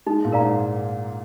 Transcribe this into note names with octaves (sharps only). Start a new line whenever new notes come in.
G#3 D#4
A#2
A#4 D5 F5 A#5
G#2